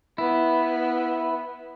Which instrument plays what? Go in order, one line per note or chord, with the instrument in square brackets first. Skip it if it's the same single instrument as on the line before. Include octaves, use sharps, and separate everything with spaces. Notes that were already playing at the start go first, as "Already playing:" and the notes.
[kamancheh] B3 [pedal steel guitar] E4